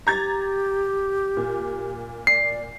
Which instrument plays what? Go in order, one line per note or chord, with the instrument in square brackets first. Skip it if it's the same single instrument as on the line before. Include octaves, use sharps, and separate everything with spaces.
[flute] G4 [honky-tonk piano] A#5 G#6 A6
[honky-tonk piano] A#2
[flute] D5 [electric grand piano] C7